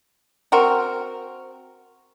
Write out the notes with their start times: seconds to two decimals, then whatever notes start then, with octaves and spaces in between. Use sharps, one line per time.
0.52 C4 F#4 A#4